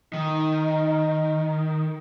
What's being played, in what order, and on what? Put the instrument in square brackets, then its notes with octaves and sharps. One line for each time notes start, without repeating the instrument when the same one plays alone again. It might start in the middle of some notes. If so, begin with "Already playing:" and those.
[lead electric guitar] D#3 [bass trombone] D#4